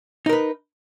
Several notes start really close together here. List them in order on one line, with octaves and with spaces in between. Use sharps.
D#4 A#4 B4